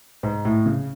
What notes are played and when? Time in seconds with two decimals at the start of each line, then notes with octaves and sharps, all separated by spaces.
0.23 G#2
0.45 A2
0.66 C#3